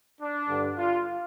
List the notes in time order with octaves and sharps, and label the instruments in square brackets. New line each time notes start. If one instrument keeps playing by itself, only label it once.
[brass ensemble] D4
G2 D3
F4